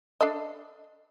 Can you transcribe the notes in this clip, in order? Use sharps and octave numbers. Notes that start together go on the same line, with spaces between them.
D4 A4 D#5